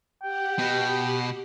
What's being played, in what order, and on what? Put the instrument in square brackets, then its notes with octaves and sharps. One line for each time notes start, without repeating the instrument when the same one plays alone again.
[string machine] G4 F#5 [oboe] G5
[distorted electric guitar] B2